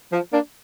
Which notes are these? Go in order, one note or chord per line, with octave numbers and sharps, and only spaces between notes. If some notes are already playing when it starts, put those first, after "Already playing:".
F3
A#3 D4